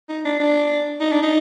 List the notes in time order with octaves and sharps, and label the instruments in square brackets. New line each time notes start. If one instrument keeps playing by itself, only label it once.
[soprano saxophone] D#4
D4
D4
D#4
D4
D#4